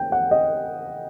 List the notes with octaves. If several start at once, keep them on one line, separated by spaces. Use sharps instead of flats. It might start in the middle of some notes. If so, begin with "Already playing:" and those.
Already playing: G5
F#5
D#5